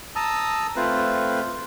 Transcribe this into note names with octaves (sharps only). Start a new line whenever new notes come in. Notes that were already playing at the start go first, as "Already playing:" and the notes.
A5 A#5 D#6 E6
A3 C4 F4 B4 C5